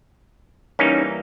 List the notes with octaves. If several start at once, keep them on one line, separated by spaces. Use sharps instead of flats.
E3 G3 A#3 C#4 D#4